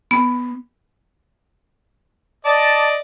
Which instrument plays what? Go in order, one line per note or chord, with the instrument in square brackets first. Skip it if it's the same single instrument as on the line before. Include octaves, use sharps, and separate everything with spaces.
[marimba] B3
[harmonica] D5 D#5 [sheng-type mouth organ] A5